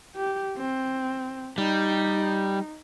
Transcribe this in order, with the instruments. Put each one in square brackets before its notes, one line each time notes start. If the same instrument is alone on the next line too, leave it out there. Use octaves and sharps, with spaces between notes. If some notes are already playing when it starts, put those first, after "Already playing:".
[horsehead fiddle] G4
C4
[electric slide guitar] G3 [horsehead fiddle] D#4